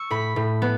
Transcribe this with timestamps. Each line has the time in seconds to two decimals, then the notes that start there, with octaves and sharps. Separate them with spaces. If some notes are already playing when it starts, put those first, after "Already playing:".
Already playing: C#6 E6
0.10 A2 B5
0.36 A2
0.62 B3